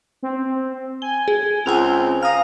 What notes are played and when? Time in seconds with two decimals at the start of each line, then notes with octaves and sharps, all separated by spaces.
0.23 C4
1.02 G#5 G7
1.28 G#4
1.66 C#2 C4 G#5 F7
2.23 F5 A#5 D#6 F6